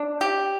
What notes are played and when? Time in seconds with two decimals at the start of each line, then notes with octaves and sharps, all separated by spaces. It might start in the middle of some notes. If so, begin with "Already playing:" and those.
Already playing: D4
0.21 G4